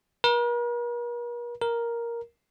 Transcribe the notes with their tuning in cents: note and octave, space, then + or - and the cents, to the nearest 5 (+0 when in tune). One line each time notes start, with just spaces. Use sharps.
A#4 +45
A#4 +5